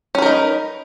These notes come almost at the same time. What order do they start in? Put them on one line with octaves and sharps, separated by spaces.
C#4 B4 A#4 D#4